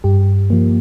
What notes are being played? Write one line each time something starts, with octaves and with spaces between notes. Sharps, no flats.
G2 G4
F3 A#3